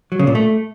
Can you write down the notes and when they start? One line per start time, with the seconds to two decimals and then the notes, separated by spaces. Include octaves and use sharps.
0.12 F#3
0.19 C#3
0.27 A#2
0.35 A3